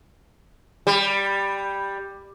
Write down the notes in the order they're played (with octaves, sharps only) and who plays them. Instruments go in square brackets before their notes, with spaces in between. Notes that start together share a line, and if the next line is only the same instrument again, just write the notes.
[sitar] G3